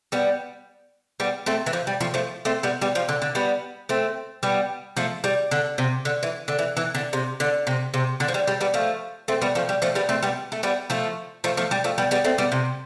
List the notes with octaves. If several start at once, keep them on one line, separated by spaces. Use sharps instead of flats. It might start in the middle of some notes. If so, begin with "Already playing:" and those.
G3 B3
G3 B3
A3 C4
E3
F3
G3
F3 A3
F3 A3
A3 C4
G3 B3
G3 B3
F3
D3
D3
G3 B3
A3 C4
G3 B3
F3 A3
G3
D3
C3
D3
E3
D3
E3
E3
D3
C3
D3
C3
C3
D3
F3
G3
G3
G3 B3
F3 A3
A3 C4
G3 B3
F3 A3
G3
F3 A3
G3 B3
A3 C4
G3 B3
A3
G3 B3
F3 A3
F3 A3
F3 A3
G3
F3 A3
G3 B3
G3 B3
A3 C4
G3 B3
C3